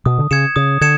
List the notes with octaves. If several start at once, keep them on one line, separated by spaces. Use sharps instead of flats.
B2 D#6
D3
C#3 G#6 C#7 E7
C#3 D#6
D3 G#6 C#7 E7